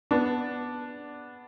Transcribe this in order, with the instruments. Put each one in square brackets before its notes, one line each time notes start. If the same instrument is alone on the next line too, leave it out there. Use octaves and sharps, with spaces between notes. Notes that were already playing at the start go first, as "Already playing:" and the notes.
[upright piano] B3 D4